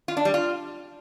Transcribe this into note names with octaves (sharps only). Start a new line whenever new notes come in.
F4
D4
G3
F4